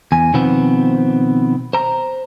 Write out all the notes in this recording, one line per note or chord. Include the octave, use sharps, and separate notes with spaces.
E2 G#5
B2 D#3 F3 B3 C4
C5 A#5